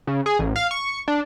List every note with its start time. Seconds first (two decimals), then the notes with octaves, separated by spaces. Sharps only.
0.07 C#3
0.26 G#4
0.39 A1
0.56 F5
0.71 C#6
1.08 D4